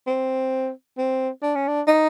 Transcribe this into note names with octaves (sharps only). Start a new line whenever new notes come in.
C4
C4
D4
C#4
D4
D#4